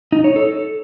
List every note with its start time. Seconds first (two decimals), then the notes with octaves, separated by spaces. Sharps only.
0.12 D#4
0.24 C#5
0.36 A4